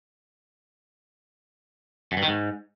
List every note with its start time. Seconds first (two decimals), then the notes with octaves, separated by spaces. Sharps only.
2.12 F#2
2.17 G2
2.23 D#3
2.28 G#2